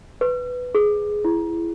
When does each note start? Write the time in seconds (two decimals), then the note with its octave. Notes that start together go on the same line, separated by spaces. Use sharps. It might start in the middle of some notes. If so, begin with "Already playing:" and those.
0.21 B4
0.75 G#4
1.25 E4